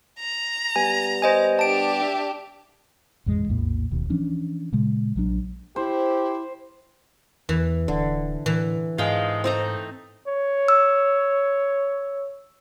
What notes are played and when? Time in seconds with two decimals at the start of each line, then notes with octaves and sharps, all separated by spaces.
0.20 A#5
0.76 G3 B3 G#5
1.22 C5 D#5 G#5
1.59 D4 G4 A5 D7
2.02 E5
3.26 A1 F2 B2 G#3
3.49 A#1 E2 A2 A#3
3.91 D1 D#2 B2
4.09 E3 F3 C#4 D4
4.72 A#2 C#3 G#3
5.16 A#1 F#3 D4
5.76 E4 G4 C5
7.49 E2 E3
7.88 D1 D3
8.46 A2 E3
8.98 G#2 D#3 F3 G#3 F5 G5
9.44 A3 C4 D#4 C5 A#5
10.27 C#5
10.68 E6